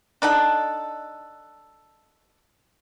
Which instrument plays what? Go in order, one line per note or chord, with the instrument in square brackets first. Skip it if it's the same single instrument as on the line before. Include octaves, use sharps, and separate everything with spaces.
[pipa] D4 D#4 A4 F#5